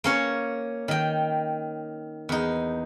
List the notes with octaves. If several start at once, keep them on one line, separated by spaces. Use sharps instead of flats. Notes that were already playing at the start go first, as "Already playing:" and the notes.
A#3 C#4 C#5
D#3 G5
E2 D#4